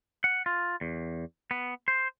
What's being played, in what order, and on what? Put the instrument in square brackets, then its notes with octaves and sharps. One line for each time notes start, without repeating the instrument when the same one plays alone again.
[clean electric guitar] F#5
F4
E2
B3
C5